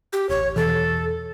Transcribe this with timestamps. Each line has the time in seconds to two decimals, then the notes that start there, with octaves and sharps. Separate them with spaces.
0.13 G4
0.29 D1 A1 C#5
0.56 E2 B2 E3 A4